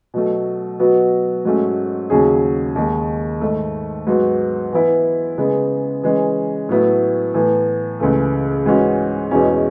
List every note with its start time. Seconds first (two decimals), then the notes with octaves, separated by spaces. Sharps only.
0.14 B2 F#3 A3
0.79 B2 F#3 B3 F#4
1.45 G#2 F#3 A3 C#4
2.10 D#2 C#3 F#3 C#4 G#4
2.76 D#2 D#3 G#3
3.41 G#2 D#3 A3
4.07 G#2 F#3 B3 F#4
4.72 E3 B3 E4
5.38 C#3 G#3 B3
6.03 E3 G#3 C#4
6.69 A2 F#3 B3 E4
7.34 A2 E3 B3
8.00 C#2 C#3 E3 A3
8.66 G#2 E3 G#3 C#4 F#4
9.31 E2 B2 G#3 C#4 E4